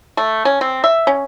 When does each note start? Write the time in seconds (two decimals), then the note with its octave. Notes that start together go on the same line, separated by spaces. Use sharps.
0.17 A3
0.45 C#4
0.61 C4
0.84 E5
1.07 C#4